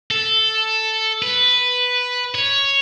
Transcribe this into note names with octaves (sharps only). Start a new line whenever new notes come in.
A4
B4
C#5